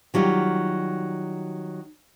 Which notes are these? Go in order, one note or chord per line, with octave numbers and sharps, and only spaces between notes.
D#3 F#3 G3 F4